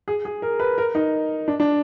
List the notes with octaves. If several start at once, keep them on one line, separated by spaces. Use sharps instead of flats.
G#4
G#4
A#4
B4
A#4
D#4
D4
D4